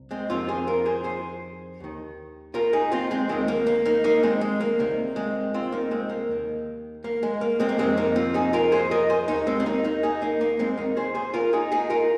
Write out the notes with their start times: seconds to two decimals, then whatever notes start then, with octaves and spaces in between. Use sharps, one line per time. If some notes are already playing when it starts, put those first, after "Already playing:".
Already playing: C2
0.11 G#3 C4
0.29 F2 C3 D#3 C4 F4
0.48 G#4 C5
0.67 F4 A#4
0.86 G#4 C5
1.04 G#4 C5
1.80 D#2 D#3
2.54 F4 A#4
2.73 D#4 G#4
2.92 C4 F4
3.11 G#3 C4
3.29 D#2 D#3 G#3 C4
3.48 A#3
3.67 A#3
3.86 A#3 D#4
4.04 A#3 D#4
4.23 G#3 C4
4.41 G#3
4.61 A#3
4.79 C2 C3 D#3 A#3
5.16 G#3 C4
5.54 C4 F4
5.72 A#3 D#4
5.91 G#3 C4
6.10 A#3
6.29 D#2 D#3
7.04 A#3
7.23 G#3
7.41 A#3
7.60 G#3 C4
7.69 A#3
7.78 F2 C3 D#3 G#3 C4
7.97 A#3 D#4
8.16 C4 F4
8.34 D#4 G#4
8.53 F4 A#4
8.72 G#4 C5
8.91 A#4 D#5
9.10 G#4 C5
9.28 D#2 D#3 A#3 D#4
9.47 G#3 C4
9.60 C4
9.66 A#3 D#4
9.84 A#3 D#4
10.03 D#4 G#4
10.22 A#3 D#4
10.41 A#3 D#4
10.59 G#3 C4
10.77 D#2 D#3 A#3 D#4
10.97 G#4 C5
11.15 G#4 C5
11.34 F4 A#4
11.53 D#4 G#4
11.72 D#4 G#4
11.90 F4 A#4